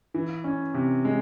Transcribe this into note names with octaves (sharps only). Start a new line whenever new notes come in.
E3
C#4
C3
G#3